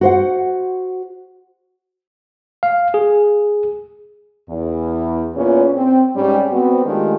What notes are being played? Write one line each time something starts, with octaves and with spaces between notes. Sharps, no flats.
F#4 C5 F#5
F5
G#4
E2
A#2 B3 C#4 E4 F4 G#4
C4
G#2 G3 C#4
B3 C4 F#4
D#3 G#3 A3 D4 F4 G4